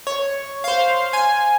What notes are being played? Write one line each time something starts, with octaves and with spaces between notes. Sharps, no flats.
C#5
C5 F5
G#5